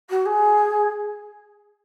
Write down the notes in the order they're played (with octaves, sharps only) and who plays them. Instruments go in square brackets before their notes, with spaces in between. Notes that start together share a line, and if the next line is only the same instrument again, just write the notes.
[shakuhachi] F#4
G#4